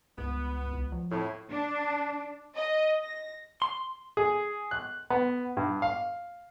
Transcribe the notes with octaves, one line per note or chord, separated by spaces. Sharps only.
C#2 G2 B3
B1
F3
F2 A2
D4
D#5
A#6
C6
G#4
F#6
B3
G2
F5